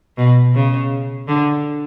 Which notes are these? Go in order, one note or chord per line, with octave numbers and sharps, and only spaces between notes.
B2
C#3
D3